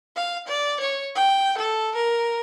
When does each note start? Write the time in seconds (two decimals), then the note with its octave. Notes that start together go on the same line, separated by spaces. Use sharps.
0.16 F5
0.47 D5
0.80 C#5
1.15 G5
1.58 A4
1.95 A#4